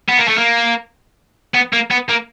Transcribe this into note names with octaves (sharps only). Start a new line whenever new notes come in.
B3
A#3
A3
A#3
B3
A#3
B3
A#3